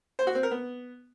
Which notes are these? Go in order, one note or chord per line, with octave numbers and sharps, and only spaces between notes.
C5
F#4
C4
A#4
B3